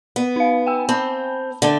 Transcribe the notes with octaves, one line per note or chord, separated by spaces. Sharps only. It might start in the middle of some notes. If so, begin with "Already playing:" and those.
B3
D#4 F5
G5 G#5 E6
C4 A5 B5
D3 A3 A4 F#5 G7